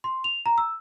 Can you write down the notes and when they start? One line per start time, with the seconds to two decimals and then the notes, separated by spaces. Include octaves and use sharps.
0.04 C6
0.24 F7
0.46 A#5
0.58 E6